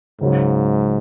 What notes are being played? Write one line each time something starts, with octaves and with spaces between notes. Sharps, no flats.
C#2 G#2 C#3 F#3